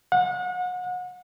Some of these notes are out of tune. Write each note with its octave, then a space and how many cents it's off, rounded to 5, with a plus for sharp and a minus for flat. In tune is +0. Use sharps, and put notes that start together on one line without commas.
F#5 -30